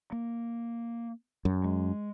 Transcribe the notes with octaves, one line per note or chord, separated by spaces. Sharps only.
A#3
F#2
G#3